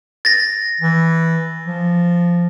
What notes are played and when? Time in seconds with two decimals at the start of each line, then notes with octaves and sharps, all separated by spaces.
0.25 A6 A#6
0.81 E3
1.66 F3